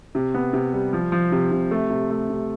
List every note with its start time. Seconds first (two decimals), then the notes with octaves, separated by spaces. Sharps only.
0.15 C3
0.34 B3
0.53 C3
0.73 G3
0.93 F3
1.12 F3
1.32 C3
1.52 C3
1.71 A3
1.90 C3
2.10 A3
2.30 C3